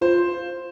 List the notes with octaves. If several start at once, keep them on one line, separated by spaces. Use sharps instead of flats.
F4 C5